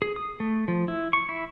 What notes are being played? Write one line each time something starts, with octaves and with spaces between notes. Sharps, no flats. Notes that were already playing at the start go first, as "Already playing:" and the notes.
G#4
D#6
A3
F3
E4
C#6
E4